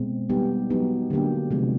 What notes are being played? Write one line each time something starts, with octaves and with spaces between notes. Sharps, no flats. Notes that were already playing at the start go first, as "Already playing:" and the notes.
Already playing: B2 G#3 C4
G3 B3 D#4 G4
F#3 B3 D#4 G4
D3 F#3 A#3 D4 G4
C3 F3 G#3 B3